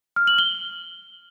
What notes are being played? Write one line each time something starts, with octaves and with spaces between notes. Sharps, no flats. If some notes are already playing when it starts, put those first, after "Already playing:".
F6
F#7
G7